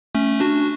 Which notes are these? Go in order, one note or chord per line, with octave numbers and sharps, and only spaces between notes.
A3 C#4
D4 F#4